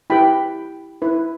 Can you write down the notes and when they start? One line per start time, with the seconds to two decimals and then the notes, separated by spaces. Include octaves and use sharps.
0.10 E4 G4 B4 G5 B5
1.02 E4 B4